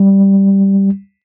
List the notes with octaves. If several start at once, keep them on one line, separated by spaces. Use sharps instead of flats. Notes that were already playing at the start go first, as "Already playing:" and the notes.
Already playing: G3